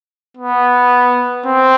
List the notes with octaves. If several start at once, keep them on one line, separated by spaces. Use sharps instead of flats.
B3
C4